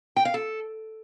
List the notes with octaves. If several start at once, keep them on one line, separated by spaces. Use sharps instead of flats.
G5
F5
A4